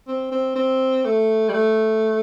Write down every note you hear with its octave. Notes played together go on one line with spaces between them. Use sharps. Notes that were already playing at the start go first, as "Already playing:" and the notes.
C4
C4
C4
A3
G3
A3